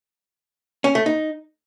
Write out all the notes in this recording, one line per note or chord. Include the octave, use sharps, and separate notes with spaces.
C#4
A3
D#4